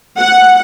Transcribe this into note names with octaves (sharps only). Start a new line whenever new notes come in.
F#5